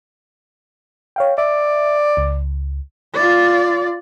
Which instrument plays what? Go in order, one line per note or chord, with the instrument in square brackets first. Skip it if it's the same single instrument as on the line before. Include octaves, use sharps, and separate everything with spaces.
[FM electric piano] C#5 F5 G5
[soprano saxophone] D5 [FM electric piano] E5
[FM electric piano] C#2
[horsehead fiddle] F4 D5